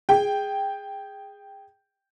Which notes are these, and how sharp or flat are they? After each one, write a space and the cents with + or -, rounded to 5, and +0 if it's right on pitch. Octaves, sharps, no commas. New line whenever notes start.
G#4 -10 G5 +0